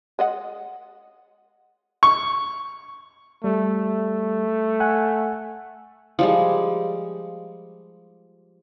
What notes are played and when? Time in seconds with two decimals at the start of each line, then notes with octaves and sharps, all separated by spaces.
0.19 G#3 D#5 F#5
2.03 C#6
3.44 G3 A3
4.80 F#5 G#5 F#6
6.19 F3 G3 G#3